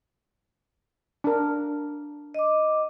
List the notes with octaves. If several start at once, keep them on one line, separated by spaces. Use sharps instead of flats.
D4 A#4
D#5 D6